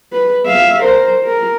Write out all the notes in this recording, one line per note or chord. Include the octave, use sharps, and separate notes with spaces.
B4
E5 F5
A#4 C5
A#4